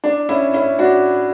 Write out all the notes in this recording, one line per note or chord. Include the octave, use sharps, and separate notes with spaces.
D4
C#4 E4
C#4 E4
D4 F#4